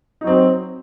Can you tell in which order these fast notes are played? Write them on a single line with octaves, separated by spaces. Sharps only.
D#4 F#3 C4